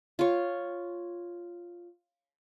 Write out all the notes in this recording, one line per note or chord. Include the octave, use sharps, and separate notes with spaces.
F4 C#5